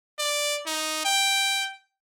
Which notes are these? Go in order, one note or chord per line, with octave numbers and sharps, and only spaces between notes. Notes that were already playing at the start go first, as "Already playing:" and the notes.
D5
D#4
G5